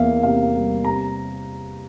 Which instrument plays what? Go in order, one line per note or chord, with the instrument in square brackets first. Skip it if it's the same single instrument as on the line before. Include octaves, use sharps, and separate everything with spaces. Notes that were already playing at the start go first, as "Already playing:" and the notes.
Already playing: [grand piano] E2 A#3 E5 F5
C3 F5
G3
C3 A#5